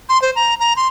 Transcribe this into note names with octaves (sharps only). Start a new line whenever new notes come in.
C6
C5
A#5
A#5
C6